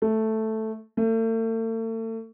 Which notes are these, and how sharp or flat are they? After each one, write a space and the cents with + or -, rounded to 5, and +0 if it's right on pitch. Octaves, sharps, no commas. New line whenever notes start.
A3 +0
A3 +40